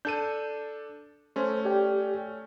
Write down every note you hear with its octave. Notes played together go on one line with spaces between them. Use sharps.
D4 A4 G6 D#7
A3 C#4 C5
G4 D5 G5